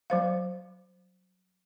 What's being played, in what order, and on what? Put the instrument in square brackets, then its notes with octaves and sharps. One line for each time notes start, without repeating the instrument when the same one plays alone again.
[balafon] F#3 C5 F5